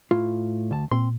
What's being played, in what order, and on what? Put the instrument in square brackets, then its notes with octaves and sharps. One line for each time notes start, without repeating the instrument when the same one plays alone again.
[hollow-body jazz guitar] A2 F4
D2 A5
[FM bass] A#2 [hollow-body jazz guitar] C4 C6